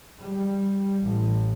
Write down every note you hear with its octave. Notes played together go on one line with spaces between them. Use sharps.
G3
A1